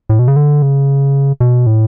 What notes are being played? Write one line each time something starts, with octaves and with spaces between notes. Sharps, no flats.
A2
B2
C#3
D3
C#3
B2
A2